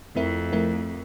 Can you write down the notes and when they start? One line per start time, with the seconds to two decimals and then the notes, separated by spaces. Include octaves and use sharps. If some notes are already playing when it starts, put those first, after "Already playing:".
0.15 F2 F3 A3 C4 E4 A#4
0.53 F3 A3 C4 E4 A#4